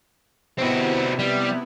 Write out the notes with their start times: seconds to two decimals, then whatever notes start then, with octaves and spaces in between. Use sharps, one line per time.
0.58 C3 B3 C4 E4 F#4
1.19 G3